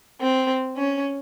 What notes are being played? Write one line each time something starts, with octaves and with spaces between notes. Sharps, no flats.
C4
C#4